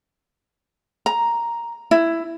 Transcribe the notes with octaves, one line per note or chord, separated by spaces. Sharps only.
A#5
E4